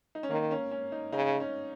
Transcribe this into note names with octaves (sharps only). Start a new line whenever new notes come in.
D#4
C#4
D#3 A#3
C#4
C#4
D#4
C#3 D#4
C#4